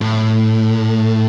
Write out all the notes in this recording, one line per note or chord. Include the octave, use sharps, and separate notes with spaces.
A2